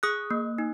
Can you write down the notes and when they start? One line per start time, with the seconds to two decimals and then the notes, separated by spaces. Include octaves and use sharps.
0.03 G#4 D#6 F#6
0.31 A#3
0.58 D#4